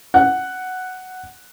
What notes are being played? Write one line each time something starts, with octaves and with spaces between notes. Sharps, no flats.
F#5